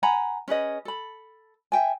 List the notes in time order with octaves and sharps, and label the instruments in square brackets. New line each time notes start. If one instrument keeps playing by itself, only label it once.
[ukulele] F#5 G#5 A#5 B5
C#4 G#4 B4 D#5
A4 B5
E5 G5 G#5